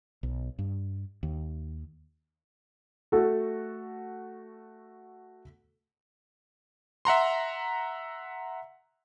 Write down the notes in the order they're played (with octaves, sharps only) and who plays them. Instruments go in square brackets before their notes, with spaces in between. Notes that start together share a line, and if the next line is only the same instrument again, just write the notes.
[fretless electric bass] B1
G2
D#2
[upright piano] A3 F#4 A4
[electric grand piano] E5 F#5 A#5 C6